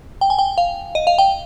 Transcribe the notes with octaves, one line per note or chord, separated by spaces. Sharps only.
G5
G#5
G5
F5
D#5
F5
G5